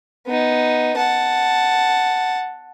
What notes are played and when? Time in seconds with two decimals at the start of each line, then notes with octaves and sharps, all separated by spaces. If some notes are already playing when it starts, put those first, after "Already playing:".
0.27 B3 D#4
0.97 F#5 A5